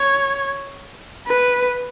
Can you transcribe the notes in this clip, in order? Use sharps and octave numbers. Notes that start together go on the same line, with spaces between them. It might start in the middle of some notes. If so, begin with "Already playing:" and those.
Already playing: C#5
B4